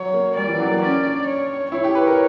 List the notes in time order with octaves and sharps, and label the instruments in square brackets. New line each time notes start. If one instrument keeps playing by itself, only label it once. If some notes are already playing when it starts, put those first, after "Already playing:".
Already playing: [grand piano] F#3 [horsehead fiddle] C#5
[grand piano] A#3
[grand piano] G3 [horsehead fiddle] D5
[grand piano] E3
F#3
A#3
[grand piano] C#4 [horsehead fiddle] D5
[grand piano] D4
[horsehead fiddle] C#5
[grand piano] E4 [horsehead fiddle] C#5
[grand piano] G4
B4
A#4